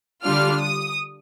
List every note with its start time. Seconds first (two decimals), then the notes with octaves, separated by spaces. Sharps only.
0.23 D3 G3 D4 F4 F6
0.59 D#6